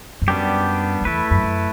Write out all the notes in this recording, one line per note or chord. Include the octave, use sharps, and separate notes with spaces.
G2
F#2 G3 B3 D4 G4
F#2
E2 A3 E4 B4
F#2
F#2